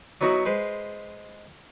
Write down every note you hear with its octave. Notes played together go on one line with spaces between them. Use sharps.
F#3 B3 D#4 E4 F#4
G#3 B4 C5